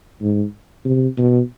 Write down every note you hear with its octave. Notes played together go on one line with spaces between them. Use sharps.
G#2
C3
B2